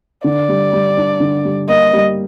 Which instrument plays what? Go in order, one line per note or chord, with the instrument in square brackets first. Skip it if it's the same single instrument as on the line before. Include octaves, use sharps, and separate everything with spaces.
[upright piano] D3 [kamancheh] D5
[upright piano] G3
G3
D4
D3
G3
[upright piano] A#3 [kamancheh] D#5
[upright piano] G3